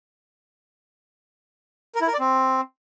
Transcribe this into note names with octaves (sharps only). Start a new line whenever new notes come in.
A#4
E4
A#4
D5
C4